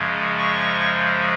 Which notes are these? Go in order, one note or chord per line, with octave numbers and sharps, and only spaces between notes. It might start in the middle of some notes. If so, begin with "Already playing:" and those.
Already playing: F#2 C#3 F3 G#3
C#6